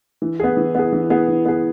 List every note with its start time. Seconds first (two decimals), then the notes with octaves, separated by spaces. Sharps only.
0.22 E3
0.40 B3 G#4
0.57 E3
0.75 B3 G#4
0.92 E3
1.10 B3 G#4
1.28 E3
1.45 B3 G#4